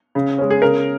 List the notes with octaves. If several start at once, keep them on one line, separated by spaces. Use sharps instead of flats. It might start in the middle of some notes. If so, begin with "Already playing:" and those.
C#3
G#3 C#4
G#4
C#3 A#4